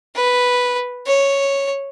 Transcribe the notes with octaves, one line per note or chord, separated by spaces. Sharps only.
B4
C#5